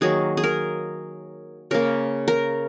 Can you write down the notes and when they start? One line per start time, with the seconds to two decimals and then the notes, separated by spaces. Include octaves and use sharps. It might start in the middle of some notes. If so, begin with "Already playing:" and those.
0.01 D#3 F#3 A#3 G#4
0.37 G#4
0.43 A#4
1.71 C#3 A#3 A#4
2.28 A#4